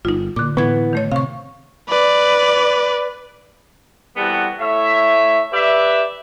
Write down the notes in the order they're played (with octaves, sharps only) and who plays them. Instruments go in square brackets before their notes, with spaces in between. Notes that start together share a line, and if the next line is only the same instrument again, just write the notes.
[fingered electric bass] G1 [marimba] D#4 F4
[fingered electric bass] A#2 [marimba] D3 D6
[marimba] A2 G#6 [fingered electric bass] E3 B3
[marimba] D#3 A3 C#5
[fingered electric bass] C3 [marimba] F5 C#6
[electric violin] B4 D5
[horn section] E3 G3 B3 C4 F#4 A4
A3 E4 C#5 E5
G4 B4 D5 E5